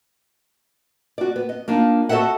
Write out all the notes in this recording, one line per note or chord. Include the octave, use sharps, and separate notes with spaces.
F#4 D5
B3
D#5
A#3 D4 D#4 F4
F#4 A4 C#5 D#5 E5 F#5